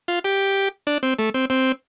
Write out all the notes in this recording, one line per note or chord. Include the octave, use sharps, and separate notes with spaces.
F4
G4
D4
C4
A3
C4
C4